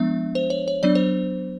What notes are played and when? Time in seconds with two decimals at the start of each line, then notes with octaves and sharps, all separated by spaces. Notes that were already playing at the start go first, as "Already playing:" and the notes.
Already playing: F3 G#3 B3 D4 E5
0.35 C5
0.50 C#5
0.68 C#5
0.83 F#3 B3 D4 D5
0.95 C5